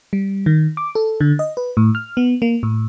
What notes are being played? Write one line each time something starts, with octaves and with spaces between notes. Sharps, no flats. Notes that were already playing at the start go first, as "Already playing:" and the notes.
G3
D#3
D6
A4
D3
D#5
B4
A2
F6
B3
A#3
A2